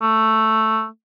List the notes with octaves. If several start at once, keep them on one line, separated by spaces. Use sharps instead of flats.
A3